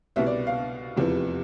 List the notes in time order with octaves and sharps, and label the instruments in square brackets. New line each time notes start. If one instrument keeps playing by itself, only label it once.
[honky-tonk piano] C2 B2 B3 E5
D5
F5
F1 E2 C3 F3 B3